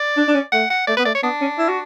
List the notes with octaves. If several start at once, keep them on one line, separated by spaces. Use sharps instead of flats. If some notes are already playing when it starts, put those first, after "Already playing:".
Already playing: D5
D4
D4
C#4
A3 F#5
F#5
A3 D5
B3 B4
A3 D5
C#5
B3 D4
C#4
E4
F#4